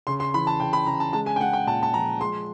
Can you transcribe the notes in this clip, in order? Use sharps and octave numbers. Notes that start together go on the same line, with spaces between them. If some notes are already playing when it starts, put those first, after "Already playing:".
C#3 C6
C6
E3 B5
A5
C#3 G5
B5
C#3 A#5
A5
G#3 A5
G#5
G5
G#3 F#5
G5
A#2 A5
A5
F3 A#5
G#3 C6